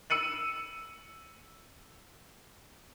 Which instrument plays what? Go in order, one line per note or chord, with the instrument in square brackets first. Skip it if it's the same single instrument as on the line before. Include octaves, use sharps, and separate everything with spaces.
[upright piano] E6 C#7 D#7 F#7